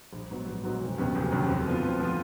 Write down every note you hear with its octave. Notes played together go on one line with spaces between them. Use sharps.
A#1
G#2 F#3 B3 F#4
A#1
G#2 F#3 B3 F#4
F1
D#2 C#3 F#3 B3
F1
D#2 C#3 F#3 B3
F2
F3 B3 F4
F2
F3 B3 F4